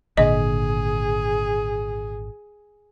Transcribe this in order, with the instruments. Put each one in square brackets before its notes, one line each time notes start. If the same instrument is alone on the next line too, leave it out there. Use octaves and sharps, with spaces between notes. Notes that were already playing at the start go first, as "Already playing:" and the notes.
[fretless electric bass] G#1 A#2 D3 [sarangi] G#4 [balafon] D#5